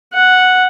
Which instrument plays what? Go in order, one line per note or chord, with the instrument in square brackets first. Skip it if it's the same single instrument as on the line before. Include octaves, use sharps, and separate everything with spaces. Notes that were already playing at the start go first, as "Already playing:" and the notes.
[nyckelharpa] F#5